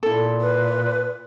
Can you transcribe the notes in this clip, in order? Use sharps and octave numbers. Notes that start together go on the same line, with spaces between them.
A#2 E4 A4
B4